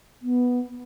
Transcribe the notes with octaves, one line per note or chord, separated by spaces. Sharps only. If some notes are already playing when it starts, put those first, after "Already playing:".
B3